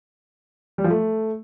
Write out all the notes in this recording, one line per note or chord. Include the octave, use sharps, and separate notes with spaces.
G3
F3
A3